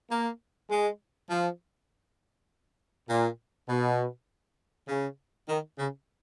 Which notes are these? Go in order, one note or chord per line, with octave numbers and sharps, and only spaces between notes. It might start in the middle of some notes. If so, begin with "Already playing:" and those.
A#3
G#3
F3
A#2
B2
C#3
D#3
C#3